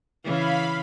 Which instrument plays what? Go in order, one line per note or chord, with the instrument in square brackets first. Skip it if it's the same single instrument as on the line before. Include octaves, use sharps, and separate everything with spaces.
[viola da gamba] C#3 E3 [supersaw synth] F5 B5